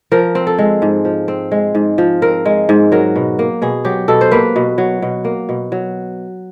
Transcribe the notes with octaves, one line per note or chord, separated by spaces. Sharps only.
F3 A#4
C4
A4
G#3
G#2
F3
C4
G#3
G#2
F3
C4 A#4
G#3
G#2
F#3 A#4
B2
A#3
B2 G#4
F#3 G4
B2 A4
C5
A#3 B4
B2
F#3
B2
A#3
B2
F#3